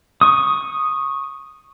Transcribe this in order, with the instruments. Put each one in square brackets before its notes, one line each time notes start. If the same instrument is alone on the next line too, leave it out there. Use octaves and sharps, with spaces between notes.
[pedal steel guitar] C#6 D#6